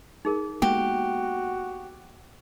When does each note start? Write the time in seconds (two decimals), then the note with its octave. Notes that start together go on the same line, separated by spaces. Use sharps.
0.25 D#4 G#4 A#4
0.62 G#3 A#3 B3 F#4 G4